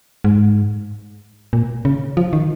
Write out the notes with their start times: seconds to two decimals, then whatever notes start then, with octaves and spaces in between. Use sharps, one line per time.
0.24 G#2
1.53 A#2
1.85 C#3
2.17 F3
2.33 D#3